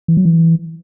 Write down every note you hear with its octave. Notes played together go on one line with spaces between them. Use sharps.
E3
F#3
E3